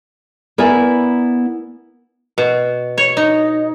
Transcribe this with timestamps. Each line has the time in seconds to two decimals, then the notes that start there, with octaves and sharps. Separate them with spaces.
0.58 B3 E4 A#4 D5 G#5
2.38 B2
2.98 C#5
3.17 D#4